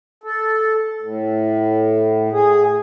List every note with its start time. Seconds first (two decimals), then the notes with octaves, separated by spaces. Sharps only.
0.24 A4
1.02 A2
2.32 G#4